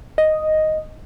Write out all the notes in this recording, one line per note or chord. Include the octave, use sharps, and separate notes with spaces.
D#5